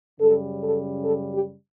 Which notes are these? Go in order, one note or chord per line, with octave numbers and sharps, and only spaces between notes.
F#2 C#3 G3 A4
A4
A4
G4